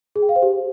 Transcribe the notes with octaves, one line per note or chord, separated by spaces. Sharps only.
G#4
G5
F5
C5
G4